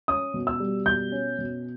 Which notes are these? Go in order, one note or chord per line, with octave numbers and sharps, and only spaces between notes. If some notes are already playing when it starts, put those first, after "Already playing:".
C#4 D#6
B2
E6
G3
B2 G6
C#4
B2